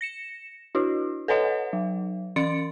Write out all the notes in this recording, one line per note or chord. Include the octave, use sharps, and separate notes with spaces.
A#6 C#7 E7
D4 E4 F#4
A4 B4 C#5 D#5 F#5
F#3
E3 C#4 C6 A6 C#7 D7